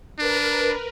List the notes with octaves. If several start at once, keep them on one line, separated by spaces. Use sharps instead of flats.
D4 A#4 B4